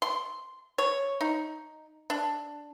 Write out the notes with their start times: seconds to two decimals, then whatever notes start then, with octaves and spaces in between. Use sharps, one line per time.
0.02 C6
0.78 C#5
1.21 D#4
2.10 D4